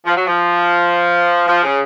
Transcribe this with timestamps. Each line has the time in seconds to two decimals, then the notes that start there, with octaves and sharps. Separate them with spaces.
0.06 F3
0.16 F#3
0.27 F3
1.47 F3
1.64 C#3